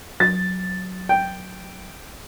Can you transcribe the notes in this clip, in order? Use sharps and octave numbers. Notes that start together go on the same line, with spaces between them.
F#3 A6
G5